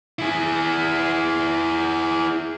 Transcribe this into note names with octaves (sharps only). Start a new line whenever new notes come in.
E4 G#4